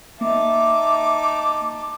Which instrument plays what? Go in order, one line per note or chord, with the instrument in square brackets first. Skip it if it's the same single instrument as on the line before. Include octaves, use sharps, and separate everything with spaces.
[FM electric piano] A#3 [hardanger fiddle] D#4 A5 [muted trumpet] E5 [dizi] D6